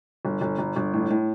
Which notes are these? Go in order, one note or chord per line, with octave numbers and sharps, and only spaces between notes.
G1
G1
G1
G1
A2
A2